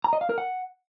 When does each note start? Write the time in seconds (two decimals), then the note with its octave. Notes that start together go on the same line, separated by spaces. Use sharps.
0.04 A#5
0.13 D#5
0.21 F5
0.29 A#4
0.38 F#5